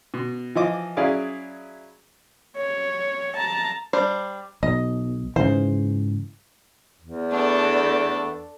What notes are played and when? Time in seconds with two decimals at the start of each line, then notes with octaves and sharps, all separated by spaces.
0.14 B2
0.55 E3 F3 D#5 D6
0.97 F#3 C#4 E4 G#4 D5 F5
2.57 C#5
3.36 A5 A#5
3.93 G3 D4 C5
4.63 B1 D#5
5.36 G#2 C#3 E3 C5
7.01 E2
7.32 A3 B3 D4 A4